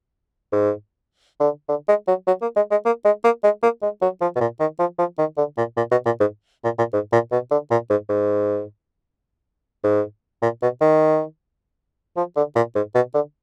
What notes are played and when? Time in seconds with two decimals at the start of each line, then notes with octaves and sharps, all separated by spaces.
0.53 G#2
1.40 D3
1.69 D3
1.88 G#3
2.08 F#3
2.27 F#3
2.42 A#3
2.56 G#3
2.71 G#3
2.86 A#3
3.05 G#3
3.24 A#3
3.44 G#3
3.63 A#3
3.82 G#3
4.02 F#3
4.21 F3
4.36 B2
4.41 A#2
4.60 D#3
4.79 F3
4.99 F3
5.18 D#3
5.37 D3
5.57 A#2
5.77 A#2
5.91 B2
6.06 A#2
6.20 G#2
6.64 A#2
6.78 A#2
6.93 G#2
7.12 A#2
7.32 B2
7.51 D3
7.71 A#2
7.90 G#2
8.09 G#2
9.84 G#2
10.42 A#2
10.62 B2
10.81 D#3
12.17 F3
12.37 D3
12.56 A#2
12.75 G#2
12.95 B2
13.14 D3